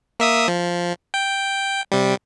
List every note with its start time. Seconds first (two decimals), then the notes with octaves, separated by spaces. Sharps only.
0.20 A#3 E5 D#6
0.48 F3
1.14 G5
1.92 C3 G3